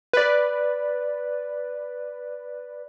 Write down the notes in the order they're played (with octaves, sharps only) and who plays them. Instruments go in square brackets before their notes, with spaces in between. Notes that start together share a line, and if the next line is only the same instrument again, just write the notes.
[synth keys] B4 D5